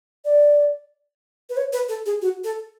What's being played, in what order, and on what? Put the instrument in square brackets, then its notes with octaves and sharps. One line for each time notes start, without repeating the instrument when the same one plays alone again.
[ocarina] D5
B4
C#5
B4
A4
G#4
F#4
A4